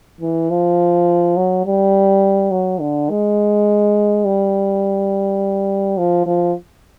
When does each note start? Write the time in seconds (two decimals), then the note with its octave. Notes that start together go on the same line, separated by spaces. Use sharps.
0.21 E3
0.51 F3
1.37 F#3
1.66 G3
2.52 F#3
2.81 D3
3.10 G#3
4.25 G3
5.98 F3
6.26 F3